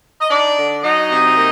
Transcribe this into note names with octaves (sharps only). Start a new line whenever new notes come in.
D#5
D4 D#4 D5
D3
F#3 D#4 D#5
C3
A#3